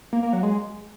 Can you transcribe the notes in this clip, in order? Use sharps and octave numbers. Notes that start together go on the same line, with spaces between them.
A#3
A#3
F#3
G#3